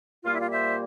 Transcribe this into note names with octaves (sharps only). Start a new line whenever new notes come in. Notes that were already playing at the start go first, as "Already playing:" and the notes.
A#2 G3 A#3 F4
E4
F4
C5 E5